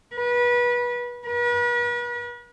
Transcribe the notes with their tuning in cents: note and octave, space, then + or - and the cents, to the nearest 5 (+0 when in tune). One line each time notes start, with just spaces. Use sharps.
B4 -30
B4 -40